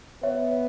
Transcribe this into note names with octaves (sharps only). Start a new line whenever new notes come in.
B3 C#5 E5